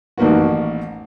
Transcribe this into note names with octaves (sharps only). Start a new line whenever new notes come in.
A1 D#3 A#3 B3 F#4